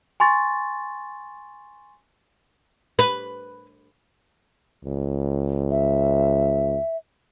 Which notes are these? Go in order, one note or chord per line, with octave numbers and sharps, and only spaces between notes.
G#5 C6 C#6 A6
B4
C#2
E5